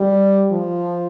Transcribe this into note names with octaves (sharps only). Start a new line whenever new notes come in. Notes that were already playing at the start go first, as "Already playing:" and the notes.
Already playing: G3
F3